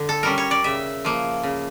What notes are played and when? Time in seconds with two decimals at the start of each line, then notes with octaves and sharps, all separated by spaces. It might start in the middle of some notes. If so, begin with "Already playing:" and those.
Already playing: D3
0.09 A4
0.23 G3 C#4 A#4
0.38 C#5
0.51 D5
0.64 C#3 E5
1.05 F3 A#3
1.43 C#3